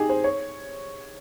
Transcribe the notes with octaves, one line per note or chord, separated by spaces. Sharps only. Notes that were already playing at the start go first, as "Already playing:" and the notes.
Already playing: D#4 G4 G#4
C5
C#5